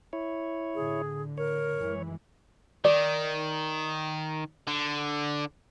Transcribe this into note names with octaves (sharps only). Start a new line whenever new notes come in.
E4 C#5
A2 D3 G#4
A#4 C#5
F#2 E3 G#3
D#3 D5
D3